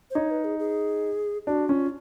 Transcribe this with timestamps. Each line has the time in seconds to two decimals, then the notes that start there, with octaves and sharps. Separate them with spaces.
0.10 C5
0.15 D#4 C#5
0.31 B4
0.44 G#4
0.59 G#4
1.47 D4 F#4
1.69 C#4 F4